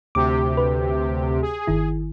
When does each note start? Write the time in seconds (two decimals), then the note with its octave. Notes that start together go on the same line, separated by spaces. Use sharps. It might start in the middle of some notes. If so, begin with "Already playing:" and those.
0.15 D2 C3 G4 D6
0.57 B4
1.42 G#4
1.67 G1 D#3 E4